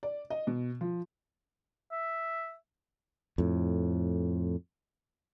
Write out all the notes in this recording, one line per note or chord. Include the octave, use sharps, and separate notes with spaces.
D5
D#5
B2
F3
E5
F2 A2